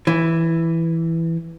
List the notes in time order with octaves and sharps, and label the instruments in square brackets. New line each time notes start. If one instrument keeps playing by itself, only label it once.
[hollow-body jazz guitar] E3